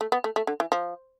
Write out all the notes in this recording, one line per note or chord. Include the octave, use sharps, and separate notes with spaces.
A3
B3
A3
A3
D3
E3
F3